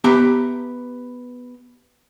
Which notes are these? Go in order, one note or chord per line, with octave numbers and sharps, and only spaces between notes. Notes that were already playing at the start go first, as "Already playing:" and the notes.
B3 G4 E5 A#5